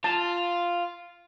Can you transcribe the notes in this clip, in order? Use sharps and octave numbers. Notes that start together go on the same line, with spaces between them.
F4 A5